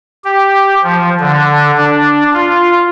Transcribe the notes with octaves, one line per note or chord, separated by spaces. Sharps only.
G4
F3
D3
D4
F4